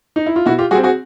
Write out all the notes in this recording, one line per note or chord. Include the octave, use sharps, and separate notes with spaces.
D#4
E4
F4
B2 E4 F#4
F4 G4
G3 C4 F#4 G#4
F#4 G#4